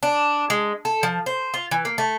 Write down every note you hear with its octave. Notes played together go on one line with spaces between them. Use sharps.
D4
G#3
A4
F3
C5
F4
E3
A#3
A3